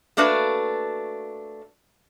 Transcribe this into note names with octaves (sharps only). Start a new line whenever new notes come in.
A3 A#3 D4 F#4 B4